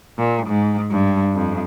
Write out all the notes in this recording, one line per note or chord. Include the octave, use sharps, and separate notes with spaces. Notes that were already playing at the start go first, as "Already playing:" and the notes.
A#2
G#2
G2
F2